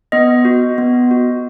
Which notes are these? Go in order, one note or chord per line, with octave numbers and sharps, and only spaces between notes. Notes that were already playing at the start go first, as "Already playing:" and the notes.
B3 D#5
F#4
B3
F#4